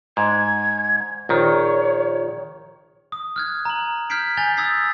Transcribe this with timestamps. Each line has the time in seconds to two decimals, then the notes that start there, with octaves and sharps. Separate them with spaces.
0.17 G#2 G#6
1.29 A#1 D#3 C#5
3.12 D#6
3.36 F6 F#6 G#6
3.65 A#5 F#7
4.10 F6 G6 G#6 B6 C7 D7
4.37 G#5 G6 A6 F7 G7
4.57 D#6 E6 G#6 A6 B6 C7